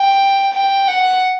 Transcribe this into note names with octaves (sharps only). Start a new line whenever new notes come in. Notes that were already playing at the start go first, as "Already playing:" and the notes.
Already playing: G5
G5
F#5